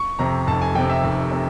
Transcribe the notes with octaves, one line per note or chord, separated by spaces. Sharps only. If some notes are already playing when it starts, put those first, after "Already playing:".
Already playing: C#6
F2 C3 A#5
F1 A5
G#5
F2 C3 G5
E5
F1
C3